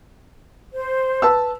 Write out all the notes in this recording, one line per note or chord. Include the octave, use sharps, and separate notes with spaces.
C5
B4 A5 E6